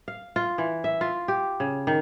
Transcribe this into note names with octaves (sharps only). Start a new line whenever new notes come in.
F5
F4
E3
E5
F4
G4
C#3
D#3